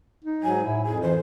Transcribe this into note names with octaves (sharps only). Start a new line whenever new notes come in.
D#4
G#2 F#3 G#5
A2 E4
F2 G#4
E3 C5